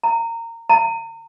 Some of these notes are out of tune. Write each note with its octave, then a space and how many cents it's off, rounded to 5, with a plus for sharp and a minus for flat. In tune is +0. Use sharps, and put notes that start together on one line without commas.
A#5 -20
A#5 -35